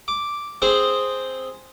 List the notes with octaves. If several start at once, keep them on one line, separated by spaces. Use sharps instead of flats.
D6
C4 G#4 C5